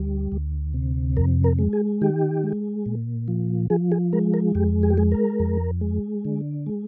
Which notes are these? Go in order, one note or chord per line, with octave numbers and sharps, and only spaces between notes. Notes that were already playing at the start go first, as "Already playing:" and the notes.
Already playing: D2 G3
D2
C3
F2 A#4
A#4
G#3
G#4
D#3 G4
G#3
A#2
F3
F3 G#4
G#4
G#3 A#4
A#4
F2 G4
G#4
G4
G#3 G#4
A#4
F2
G#3
D3
G#3